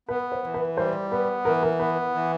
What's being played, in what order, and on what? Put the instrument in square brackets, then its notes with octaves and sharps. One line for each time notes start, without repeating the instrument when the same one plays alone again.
[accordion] B3 [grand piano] B4
[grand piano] C5
[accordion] E3
[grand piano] B4
[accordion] G3 [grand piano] C5
[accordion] B3 [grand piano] B4
[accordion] E3 [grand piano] A#4
[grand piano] A#4
[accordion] B3 [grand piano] B4
[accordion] E3